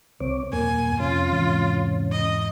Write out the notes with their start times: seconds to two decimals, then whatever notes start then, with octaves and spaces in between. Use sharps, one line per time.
0.20 C2 C4 C#5 D6
0.53 D#1 F#2 A#3 G#5
1.00 F2 C3 C#4 F4
1.32 E2 G#2 E3
2.12 D#5